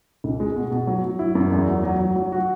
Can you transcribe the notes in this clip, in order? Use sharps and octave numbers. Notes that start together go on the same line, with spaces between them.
C#2
G#3
B2
B2
F#3
F#3
E4
F#2
E2
F#3
F#3
F#3
F#3
F#4